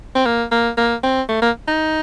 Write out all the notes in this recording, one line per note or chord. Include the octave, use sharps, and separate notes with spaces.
C4
A#3
A#3
A#3
C4
A3
A#3
D#4